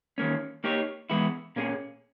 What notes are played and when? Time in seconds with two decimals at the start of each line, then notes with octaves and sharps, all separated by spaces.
0.18 D#3 A#3 C#4
0.64 A#3 D#4 G4 C#5
1.10 E3 G#3 B3 E4
1.56 A#2 A#3 C#4 G#4